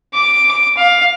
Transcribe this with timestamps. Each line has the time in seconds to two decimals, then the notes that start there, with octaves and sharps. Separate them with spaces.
0.14 D6
0.77 F5